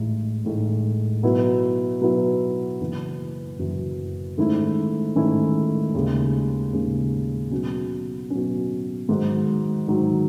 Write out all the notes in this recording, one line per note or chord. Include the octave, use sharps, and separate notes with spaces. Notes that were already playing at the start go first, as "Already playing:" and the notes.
Already playing: A1 A2 G#3 D#4
A1 A2 G#3 D#4
B2 F#3 B3 E4
B2 F#3 B3 E4
F#1 F#2 E3
F#1 F#2 E3
G#2 D#3 A3 C#4 E4
G#2 D#3 A3 C#4 E4
D#2 C#3 G#3
D#2 C#3 G#3
B2 F#3 C#4
B2 F#3 C#4
G#2 D#3 F#3
G#2 D#3 F#3